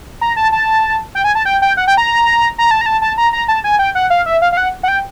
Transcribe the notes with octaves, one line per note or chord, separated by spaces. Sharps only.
A#5
A5
A5
G5
G#5
A5
G5
G5
F#5
G5
A#5
A#5
A5
A#5
A5
A5
A#5
A#5
A5
G#5
G5
F#5
F5
E5
F5
F5
F#5
F#5
G5